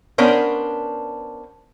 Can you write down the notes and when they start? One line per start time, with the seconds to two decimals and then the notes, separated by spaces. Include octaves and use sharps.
0.18 B3 C#4 D4 A#4 C5